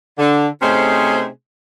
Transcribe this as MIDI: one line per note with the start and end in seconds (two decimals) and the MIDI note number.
0.18 0.47 50
0.61 1.26 48
0.61 1.26 57
0.61 1.26 61
0.61 1.26 63
0.61 1.26 68
0.61 1.26 72